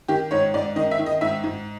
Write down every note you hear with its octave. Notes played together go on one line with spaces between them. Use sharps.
D#3 G4
G#2 C#5
G#2 D5
D#3 D#5
E5
D#3
D#5
G#2 E5
G#2